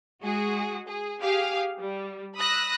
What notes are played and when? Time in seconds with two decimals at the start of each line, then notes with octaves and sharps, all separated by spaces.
0.22 G#3 F#4 G#4
0.86 G#4
1.21 G4 G#4 F5
1.79 G3
2.36 B5 D#6 E6 F#6 A#6